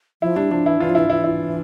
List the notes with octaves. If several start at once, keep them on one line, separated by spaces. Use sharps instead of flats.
F3 E4
G3 D4
F3 D4
E3 E4
E3 D4 F4
F3
E3 E4
E3 E4
E4